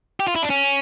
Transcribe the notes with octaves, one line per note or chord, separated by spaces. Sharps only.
G4
F4
E4
D4
C#4